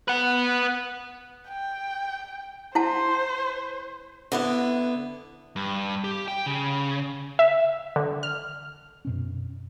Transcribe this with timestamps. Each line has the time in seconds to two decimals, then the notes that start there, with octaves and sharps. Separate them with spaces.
0.08 B4 F#5
1.49 G5
2.75 E4 C5 F#5 A5
4.32 D3 B3 E4
5.56 G2
6.04 G4
6.28 G5
6.46 C#3
7.39 E5
7.96 D3
8.23 F6
9.05 F#2 B2 C#4